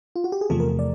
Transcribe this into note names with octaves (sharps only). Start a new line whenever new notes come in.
F4
F#4
G4
G#4
E2 C3 F3 A3 A4
A#4
D5